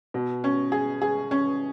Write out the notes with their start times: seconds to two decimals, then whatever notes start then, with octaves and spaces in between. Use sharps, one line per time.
0.14 B2
0.44 C#4
0.72 G#4
1.02 G#4
1.31 C#4